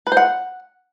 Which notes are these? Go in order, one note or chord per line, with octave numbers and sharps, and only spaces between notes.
B4
C5
F#5